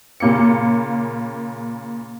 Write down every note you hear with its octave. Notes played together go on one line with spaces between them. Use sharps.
A#2 C#3 A#3 D6 C#7